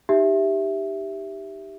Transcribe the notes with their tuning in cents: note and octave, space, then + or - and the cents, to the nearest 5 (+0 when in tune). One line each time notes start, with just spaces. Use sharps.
D#4 +0 G4 +0 E5 +0